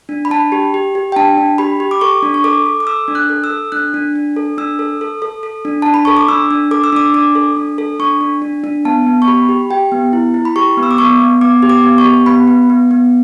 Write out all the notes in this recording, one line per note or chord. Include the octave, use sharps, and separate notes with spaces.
D4
B5
D4 A5
G4
G4
G4
G5
D4 A5
D4
G4 B5
G4
D6
A4 C#6
D4
C#6
A4 D6
A4
D6
A4 E6
D4
F#6
A4
E6
A4
D4 F#6
D4
D4
A4
D4 E6
A4
A4
A4
A4
D4
D4 A5
B5
A4 C#6
D6
D4 E6
D4
A4 D6
E6
D4 D6
D4 D6
A4
D4
A4
D4 C#6
D4
D4
D4
B3 A5
B3
C#6
G4 B5
G4
G4 G5
B3
E4
E4
B5
G4 C#6
B3
E6
D6
B3 C#6
B3
B3 D6
G4
D6
B3
C#6
G4
B3 B5
B3
B3
B3